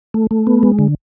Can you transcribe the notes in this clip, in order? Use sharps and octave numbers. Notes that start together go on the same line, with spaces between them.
A3
A3
B3
G#3
D3